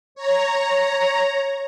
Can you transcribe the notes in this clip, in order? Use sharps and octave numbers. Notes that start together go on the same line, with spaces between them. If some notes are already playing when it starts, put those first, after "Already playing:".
C#5 A#5